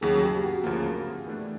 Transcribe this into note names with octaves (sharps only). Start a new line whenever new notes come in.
D#2 C#3 F#3 G#4
G4
F#4
D2 C#3 F3 A#3
E3 A3 D4